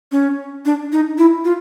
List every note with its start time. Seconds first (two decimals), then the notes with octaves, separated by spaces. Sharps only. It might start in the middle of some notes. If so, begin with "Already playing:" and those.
0.12 C#4
0.66 D4
0.93 D#4
1.18 E4
1.45 F4